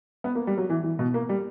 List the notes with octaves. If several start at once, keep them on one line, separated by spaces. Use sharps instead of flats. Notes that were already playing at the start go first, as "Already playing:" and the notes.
B3
A#3
G3
F#3
E3
E3
B2
A#3
G3